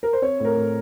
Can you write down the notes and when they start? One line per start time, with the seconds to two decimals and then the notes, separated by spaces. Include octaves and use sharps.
0.03 A#4
0.13 C5
0.22 C4 C#5
0.40 A2 A#4
0.56 A2